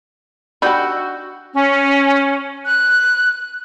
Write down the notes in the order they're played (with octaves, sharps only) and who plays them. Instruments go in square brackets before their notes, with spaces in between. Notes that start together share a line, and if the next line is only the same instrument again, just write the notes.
[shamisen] D4 D#4 G4 [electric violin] F#4 [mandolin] B5 E6 G6
[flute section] C#4
F#6